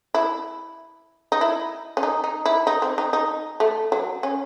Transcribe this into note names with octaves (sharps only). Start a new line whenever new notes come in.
E4
D#4
E4
C#4
D#4
D#4
E4
D#4
C4
D#4
D#4
A3
F#3
C#4